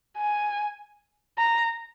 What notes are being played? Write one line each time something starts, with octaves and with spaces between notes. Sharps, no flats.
G#5
A#5